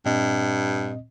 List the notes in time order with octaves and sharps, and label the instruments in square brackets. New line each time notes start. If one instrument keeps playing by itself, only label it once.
[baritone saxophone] G2 [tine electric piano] A#2 C4 D#5